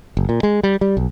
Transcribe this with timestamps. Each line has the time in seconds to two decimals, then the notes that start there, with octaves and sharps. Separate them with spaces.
0.17 F#1
0.29 A#2
0.43 G#3
0.63 G3
0.81 G3
0.97 B1